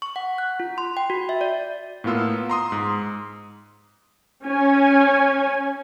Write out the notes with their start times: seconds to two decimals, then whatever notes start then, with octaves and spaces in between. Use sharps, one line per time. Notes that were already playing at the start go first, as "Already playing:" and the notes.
0.02 C#6
0.16 F#5
0.38 F#6
0.60 F4
0.78 C6
0.97 G5
1.10 F#4
1.29 E5
1.41 D5
2.04 A2 A#3 B3 F4 E6
2.49 A#5 C6 D#6
2.72 G#2
4.44 C#4 G#5